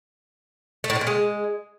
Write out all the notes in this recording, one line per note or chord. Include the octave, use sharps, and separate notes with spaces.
A3
A2
D3
A#2
G#3